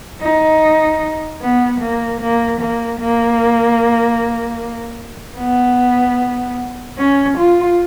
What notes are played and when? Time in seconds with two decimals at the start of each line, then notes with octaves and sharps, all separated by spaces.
0.22 D#4
1.42 B3
1.81 A#3
2.21 A#3
2.61 A#3
3.01 A#3
5.38 B3
6.98 C#4
7.38 F4